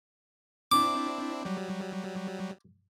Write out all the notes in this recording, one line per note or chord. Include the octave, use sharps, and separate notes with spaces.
C4 D4 E4 D6
F#3 G3